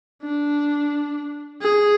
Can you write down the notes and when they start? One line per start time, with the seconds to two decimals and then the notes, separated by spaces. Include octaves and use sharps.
0.23 D4
1.62 G#4